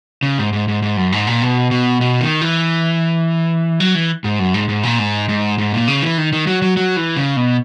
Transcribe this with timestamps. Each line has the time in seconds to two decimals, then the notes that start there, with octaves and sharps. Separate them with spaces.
0.23 C#3
0.38 G#2
0.53 G#2
0.68 G#2
0.82 G#2
0.97 F#2
1.12 G#2
1.27 A#2
1.42 B2
1.71 B2
2.01 B2
2.21 D#3
2.41 E3
3.80 F#3
3.95 E3
4.24 G#2
4.39 F#2
4.54 G#2
4.69 G#2
4.83 A#2
4.99 G#2
5.29 G#2
5.58 G#2
5.73 A#2
5.88 C#3
6.02 E3
6.18 D#3
6.33 D#3
6.47 F#3
6.62 F#3
6.77 F#3
6.97 E3
7.17 C#3
7.36 B2